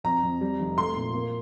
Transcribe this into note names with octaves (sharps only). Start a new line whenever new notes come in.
F2 A#5
F2
G3
F1
A3 C6
A#2
A#3